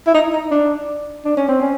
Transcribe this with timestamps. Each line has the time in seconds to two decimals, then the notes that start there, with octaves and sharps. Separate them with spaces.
0.07 E4
0.15 D#4
0.33 D#4
0.52 D4
1.25 D4
1.37 C#4
1.48 C4
1.61 C#4